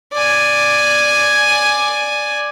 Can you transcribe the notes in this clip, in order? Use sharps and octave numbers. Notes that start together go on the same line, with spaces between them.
D5 G#5